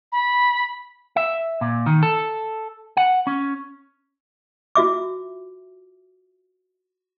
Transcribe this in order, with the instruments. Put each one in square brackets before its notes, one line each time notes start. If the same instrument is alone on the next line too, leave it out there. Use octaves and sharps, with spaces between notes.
[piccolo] B5
[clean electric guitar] E5
A#2
D#3
A4
F#5
C#4
[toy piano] F4 F#4 E5 D6